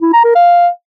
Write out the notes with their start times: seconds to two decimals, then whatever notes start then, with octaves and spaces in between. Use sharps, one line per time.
0.02 E4
0.13 A#5
0.24 A#4
0.35 F5